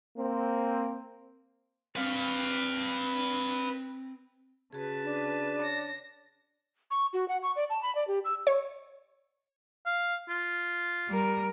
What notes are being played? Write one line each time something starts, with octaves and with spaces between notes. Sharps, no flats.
A#3 C4
C4 B4 F5
C#3 F#4 G#4 B4 A5
D4
C#5 A#6
C#6
F#4
F#5
C#6
D5
A5
B5
D5
G4
E6
C#5
F5
F4
G3 A#4